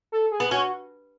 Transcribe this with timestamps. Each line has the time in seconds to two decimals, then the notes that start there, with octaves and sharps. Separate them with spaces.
0.12 A4
0.32 G#4
0.40 B3
0.51 C#4 F#4